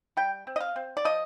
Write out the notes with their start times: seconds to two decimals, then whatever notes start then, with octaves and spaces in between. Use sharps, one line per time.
0.17 G3 G5
0.47 C4
0.56 D#5
0.61 F5
0.76 C4
0.97 D5
1.05 F3 D#5